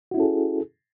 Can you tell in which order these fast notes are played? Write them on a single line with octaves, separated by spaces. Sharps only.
F#4 E4 C#4 A4 G#4